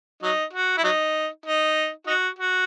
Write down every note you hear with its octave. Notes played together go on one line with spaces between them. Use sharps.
F#3 D#4
F#4
E4
F#3 D#4
D#4
D#4 F#4
F#4